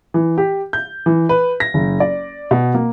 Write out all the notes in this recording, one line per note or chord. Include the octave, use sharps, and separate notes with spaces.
E3
G4
G6
E3
B4
A#6
F#1
D5
B2
A#3